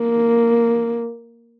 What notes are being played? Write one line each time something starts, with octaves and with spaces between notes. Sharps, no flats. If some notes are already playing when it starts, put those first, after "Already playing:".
Already playing: A#3